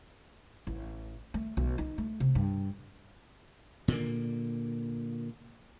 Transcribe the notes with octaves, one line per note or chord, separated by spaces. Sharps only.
A1
A3
B1
D#4
A3
C3
G2
A#2 D3 A#3